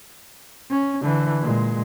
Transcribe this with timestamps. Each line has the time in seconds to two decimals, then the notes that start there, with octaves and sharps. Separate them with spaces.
0.71 C#4
1.02 D3 E3
1.41 A#2 G#3